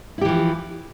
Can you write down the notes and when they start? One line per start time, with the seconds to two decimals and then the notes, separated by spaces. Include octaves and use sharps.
0.18 E4
0.21 G4
0.25 E3
0.28 F3